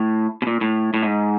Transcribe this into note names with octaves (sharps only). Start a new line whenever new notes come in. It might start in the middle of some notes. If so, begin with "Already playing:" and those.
Already playing: A2
B2
A#2
A2
A2
G#2